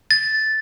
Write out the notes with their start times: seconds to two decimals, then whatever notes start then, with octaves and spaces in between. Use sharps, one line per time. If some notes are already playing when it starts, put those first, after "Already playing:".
0.11 A6